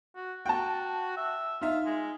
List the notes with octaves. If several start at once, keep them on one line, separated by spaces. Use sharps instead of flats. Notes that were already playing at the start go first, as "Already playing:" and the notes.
F#4
F#4 G5 A5
E5
D#4 F4 E5
G#3